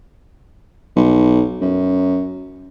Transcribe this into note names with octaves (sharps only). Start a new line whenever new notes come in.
B1
F#2